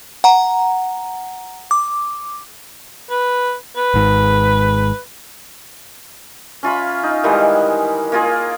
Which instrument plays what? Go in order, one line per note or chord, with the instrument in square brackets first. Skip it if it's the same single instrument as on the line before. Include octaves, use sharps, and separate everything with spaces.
[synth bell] F#5 A#5
D6
[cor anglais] B4
B4
[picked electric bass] G#1 G#2
[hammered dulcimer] C#4 F4 E5 B5
D#4
D#3 E3 G3 G#3
A#3 F4 G#4